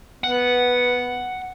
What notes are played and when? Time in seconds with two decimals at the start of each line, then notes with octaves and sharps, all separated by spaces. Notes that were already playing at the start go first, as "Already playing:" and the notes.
0.24 B3 F#5